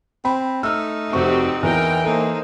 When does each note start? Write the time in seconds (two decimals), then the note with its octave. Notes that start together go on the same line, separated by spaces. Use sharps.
0.25 C4 B5
0.63 A3 D#4 E6 F6
1.13 F1 C4 F#4 G4 C5 C#6
1.63 E2 E3 A#4 G5
2.05 A#3 D#4 A4 C5